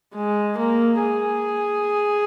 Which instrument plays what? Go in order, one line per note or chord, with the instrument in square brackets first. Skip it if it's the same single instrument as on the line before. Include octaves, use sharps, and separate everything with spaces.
[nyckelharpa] G#3
A#3
G#4